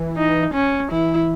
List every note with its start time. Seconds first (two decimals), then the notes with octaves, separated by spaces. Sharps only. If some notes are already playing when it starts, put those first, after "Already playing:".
Already playing: E3
0.17 D#4
0.54 C#4
0.91 E3 E4